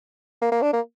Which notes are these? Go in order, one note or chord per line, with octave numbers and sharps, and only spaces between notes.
A#3
A#3
D4
A#3